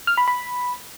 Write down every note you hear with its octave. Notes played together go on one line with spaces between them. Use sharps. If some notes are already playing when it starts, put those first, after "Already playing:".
F6
B5
B5